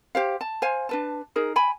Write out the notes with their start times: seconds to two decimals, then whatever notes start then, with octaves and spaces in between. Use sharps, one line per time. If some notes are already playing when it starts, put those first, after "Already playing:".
0.15 G4 C5 F5
0.41 A5
0.62 C5 F5 G#5
0.89 D4 B4 A5
1.36 D#4 G#4 A#4
1.56 G5 G#5 B5